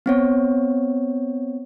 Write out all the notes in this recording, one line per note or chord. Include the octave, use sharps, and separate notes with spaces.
B3 C4 C#5